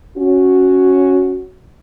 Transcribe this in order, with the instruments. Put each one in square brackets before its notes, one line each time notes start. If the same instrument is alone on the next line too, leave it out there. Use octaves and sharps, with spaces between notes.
[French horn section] C#4 F#4